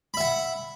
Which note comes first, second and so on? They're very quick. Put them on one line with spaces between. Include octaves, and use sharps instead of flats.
B5 E5 F#5